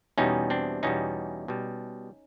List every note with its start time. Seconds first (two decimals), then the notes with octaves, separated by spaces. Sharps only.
0.18 E2 B2 G3 C#4 D#4
0.50 C4 D4
0.83 E2 B2 G3 C#4 D#4
1.48 B2 G3